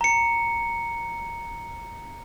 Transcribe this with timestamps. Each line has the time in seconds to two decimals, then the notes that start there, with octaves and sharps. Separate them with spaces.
0.01 A#5 C#7